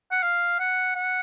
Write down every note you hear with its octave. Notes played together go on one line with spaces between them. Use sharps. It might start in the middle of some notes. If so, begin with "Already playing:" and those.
F#5
F5
F#5
F#5